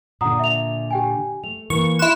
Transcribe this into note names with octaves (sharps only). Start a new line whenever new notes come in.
A#2 D3 F#5 A#5 D#6
E5 F7
G4 G5 G#5
A3 F7
E3 A#3 C#6
E4 C6 F#6 E7